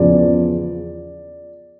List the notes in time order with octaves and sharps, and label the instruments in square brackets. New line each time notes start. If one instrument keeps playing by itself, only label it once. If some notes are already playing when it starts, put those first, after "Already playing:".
Already playing: [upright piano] E2 C#3 F3 D5